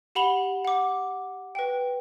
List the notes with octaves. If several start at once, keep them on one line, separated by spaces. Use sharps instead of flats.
G4 F#5 B5 F7 G7
F#5 D6
B4 G5